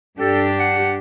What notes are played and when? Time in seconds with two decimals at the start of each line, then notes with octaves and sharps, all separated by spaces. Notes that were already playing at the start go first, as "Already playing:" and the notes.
0.19 G2 D4 G4 A4
0.59 F#5